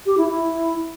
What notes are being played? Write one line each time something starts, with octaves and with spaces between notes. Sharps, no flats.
G4
E4
E4